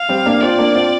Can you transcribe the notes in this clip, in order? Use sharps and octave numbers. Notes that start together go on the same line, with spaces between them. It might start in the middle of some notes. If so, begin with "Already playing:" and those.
Already playing: F5
G3 C4
A#3 D4
C4 F4 D5
A#3 D4
C4 F4